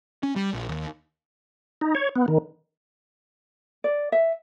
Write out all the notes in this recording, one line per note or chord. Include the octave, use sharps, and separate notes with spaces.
C#4
G3
A#1
D#2
D#4
C#5
B3
D#3
D5
E5